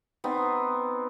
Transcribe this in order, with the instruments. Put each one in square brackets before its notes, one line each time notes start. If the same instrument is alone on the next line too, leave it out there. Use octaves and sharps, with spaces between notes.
[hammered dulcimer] B3 C4 D#4